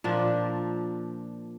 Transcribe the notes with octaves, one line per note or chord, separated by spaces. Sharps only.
A#2 F3 D4